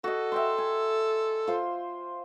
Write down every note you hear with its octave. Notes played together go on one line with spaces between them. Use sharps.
F#4 A4 D#5
E5 G5 C6
G#5
F4 C5